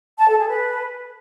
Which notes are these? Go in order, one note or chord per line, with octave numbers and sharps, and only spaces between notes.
A5
A4
G#4
B4